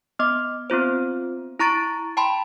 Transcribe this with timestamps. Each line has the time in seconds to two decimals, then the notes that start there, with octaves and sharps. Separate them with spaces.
0.19 B3 D#5 D6
0.70 B3 C4 F4 C5
1.59 E4 A#5 C#6 A6 D7
2.17 G5 A5 B5 C6